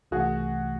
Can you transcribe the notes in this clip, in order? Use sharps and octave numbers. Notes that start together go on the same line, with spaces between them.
C2 C3 E3 A3 F#4 G#4